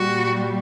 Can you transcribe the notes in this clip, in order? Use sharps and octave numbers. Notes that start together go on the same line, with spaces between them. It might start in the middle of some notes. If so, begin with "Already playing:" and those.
Already playing: A#2 G3 F#4